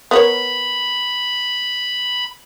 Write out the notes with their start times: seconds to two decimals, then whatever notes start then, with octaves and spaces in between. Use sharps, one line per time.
0.11 B3 A#4 C#5 B5